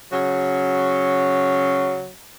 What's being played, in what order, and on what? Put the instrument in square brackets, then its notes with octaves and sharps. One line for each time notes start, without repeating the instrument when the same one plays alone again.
[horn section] C#3 F#3